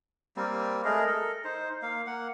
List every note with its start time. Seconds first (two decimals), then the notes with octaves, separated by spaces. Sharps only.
0.37 G3 A#3 C4
0.85 G#3 A3 G#4 A#4
1.07 A4 A#4
1.44 D#4 C5
1.82 A#3 F5
2.07 A#3 F#5